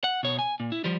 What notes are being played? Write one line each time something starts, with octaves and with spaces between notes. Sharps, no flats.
F#5
B2 C#5
G#5
A#2
E4
F3 G3